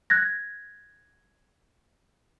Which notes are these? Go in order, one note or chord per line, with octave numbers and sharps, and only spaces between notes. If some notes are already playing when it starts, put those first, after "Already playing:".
F#6 G#6 A#6